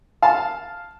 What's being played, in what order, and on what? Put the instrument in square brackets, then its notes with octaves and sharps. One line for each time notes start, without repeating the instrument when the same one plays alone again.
[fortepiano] F5 A5